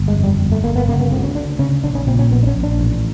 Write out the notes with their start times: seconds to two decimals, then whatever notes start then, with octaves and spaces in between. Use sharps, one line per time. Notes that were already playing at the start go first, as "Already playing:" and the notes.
Already playing: G1
0.08 G#3
0.16 F2
0.24 G3
0.40 G1
0.52 A3
0.63 G1 A#3
0.76 B3
0.88 C#3 A#3
1.00 B3
1.11 D2 C4
1.23 C#4
1.35 D2 D4
1.59 C#3 C#4
1.83 A#1 D4
1.95 C#4
2.07 A#2 C4
2.19 C#4
2.31 A#1 B3
2.43 D4
2.47 C#4
2.55 A#1
2.63 D4
2.79 A1